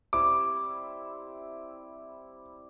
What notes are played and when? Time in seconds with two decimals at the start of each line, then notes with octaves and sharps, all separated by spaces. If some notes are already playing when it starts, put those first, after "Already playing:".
0.13 G3 C4 E4 D6